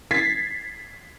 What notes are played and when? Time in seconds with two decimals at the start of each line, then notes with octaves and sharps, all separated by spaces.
0.11 G#6 A6 B6 C7